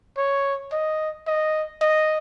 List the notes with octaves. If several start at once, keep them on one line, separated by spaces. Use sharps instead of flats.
C#5
D#5
D#5
D#5